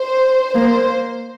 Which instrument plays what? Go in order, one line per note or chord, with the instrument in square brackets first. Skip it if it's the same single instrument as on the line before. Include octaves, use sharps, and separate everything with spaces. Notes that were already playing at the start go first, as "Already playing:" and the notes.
Already playing: [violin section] C5
[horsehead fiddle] A#3 [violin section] C5